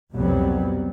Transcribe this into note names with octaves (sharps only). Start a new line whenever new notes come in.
C2 F2 B2 F#3 G3 B3